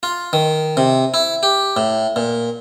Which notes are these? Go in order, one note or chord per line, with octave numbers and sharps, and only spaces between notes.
F4
D#3
C3
E4
G4
A2
A#2